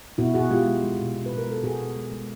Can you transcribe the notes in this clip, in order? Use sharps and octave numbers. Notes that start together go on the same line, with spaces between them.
B2 E4 F#4
B2 F#4 G#4
G#3 F4 G4
G#3
G#3
B2
B2
B4
B2
A#4
G#3 A4
B2 F#4 G#4
B2
G#3
G#3